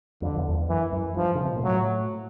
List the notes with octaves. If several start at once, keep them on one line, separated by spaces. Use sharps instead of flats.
F2 D3
F2
E2
E2
F2
F#2 E3
F#2
G2 F3
C#3
C3
B2
A#2
A2 F#3